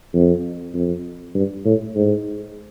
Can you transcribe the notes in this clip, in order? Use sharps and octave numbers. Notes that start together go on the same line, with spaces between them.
F2
F2
G2
A2
G#2